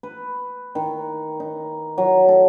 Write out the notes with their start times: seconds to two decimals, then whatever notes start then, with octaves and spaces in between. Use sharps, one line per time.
0.03 B4
0.75 D#3
1.40 D#4
1.98 F#3
2.29 A4